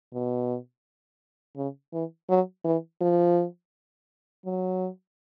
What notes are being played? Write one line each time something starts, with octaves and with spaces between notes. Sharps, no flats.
B2
C#3
E3
F#3
E3
F3
F#3